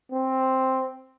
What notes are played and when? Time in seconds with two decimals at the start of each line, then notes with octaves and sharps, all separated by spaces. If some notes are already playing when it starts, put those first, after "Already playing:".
0.12 C4